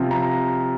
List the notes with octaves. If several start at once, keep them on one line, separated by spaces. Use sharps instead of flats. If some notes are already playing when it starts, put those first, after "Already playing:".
Already playing: C3 F3
A#5